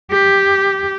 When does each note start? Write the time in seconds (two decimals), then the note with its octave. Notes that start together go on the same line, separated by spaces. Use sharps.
0.11 G4